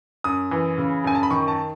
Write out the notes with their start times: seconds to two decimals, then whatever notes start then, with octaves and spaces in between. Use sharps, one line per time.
0.24 F#2 D#6
0.51 E3
0.78 C#3
1.04 F#2 G#5
1.15 A5
1.23 B5
1.31 D#3 C#6
1.48 A5